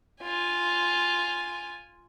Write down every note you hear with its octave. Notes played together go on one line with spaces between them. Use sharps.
F4 G#5